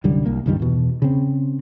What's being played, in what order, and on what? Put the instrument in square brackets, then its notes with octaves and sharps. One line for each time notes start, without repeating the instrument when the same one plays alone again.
[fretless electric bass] C2 F#2 D3 G3
C2 A#3
C#2 G2 D#3 G3
E2 B2
C#3 C4